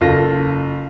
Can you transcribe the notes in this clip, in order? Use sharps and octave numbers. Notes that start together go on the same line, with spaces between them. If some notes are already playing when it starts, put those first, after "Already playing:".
F#1 F4 A4 A#6